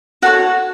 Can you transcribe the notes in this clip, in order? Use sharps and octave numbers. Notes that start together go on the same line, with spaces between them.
F#4 A4 C#5 F#5